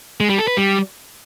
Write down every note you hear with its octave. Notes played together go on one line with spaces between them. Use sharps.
G#3
G3
A4
B4
G3